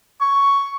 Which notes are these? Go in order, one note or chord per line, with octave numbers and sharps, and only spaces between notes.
C#6